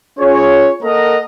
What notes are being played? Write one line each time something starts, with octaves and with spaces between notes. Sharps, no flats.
C#4 F4 G#4 C#5
A#3 A4 A#4 D#5 F#5 A#5